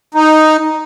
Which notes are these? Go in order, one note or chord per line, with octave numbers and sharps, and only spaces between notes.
D#4